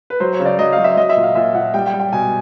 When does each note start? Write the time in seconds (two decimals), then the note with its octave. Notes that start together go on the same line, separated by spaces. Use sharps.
0.10 B4
0.20 F#3 C5
0.33 C#5
0.40 C#3
0.45 D5
0.59 F#3 D#5
0.72 F5
0.78 F#3
0.84 E5
0.97 F#3 D#5
1.09 E5
1.16 A#2
1.23 F5
1.35 A#2 E5
1.54 A#2 F#5
1.74 G3 G5
1.86 G5
1.93 G3
2.00 G5
2.13 B2 G#5